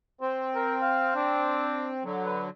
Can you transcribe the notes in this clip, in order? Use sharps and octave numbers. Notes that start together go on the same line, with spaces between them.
C4 C5
A#4
F5
D4
D3 F#3
B4